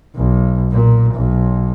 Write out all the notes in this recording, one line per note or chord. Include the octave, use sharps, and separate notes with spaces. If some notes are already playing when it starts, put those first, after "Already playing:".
B1
A#2
B1